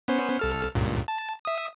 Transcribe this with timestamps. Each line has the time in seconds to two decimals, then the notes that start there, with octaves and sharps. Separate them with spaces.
0.08 B3 C#4 C5
0.39 C2 A4 F6
0.75 C#2 G2 A#2
1.08 A5
1.45 E5 D#6